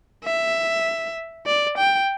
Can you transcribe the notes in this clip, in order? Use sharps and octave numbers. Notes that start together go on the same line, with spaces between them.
E5
D5
G5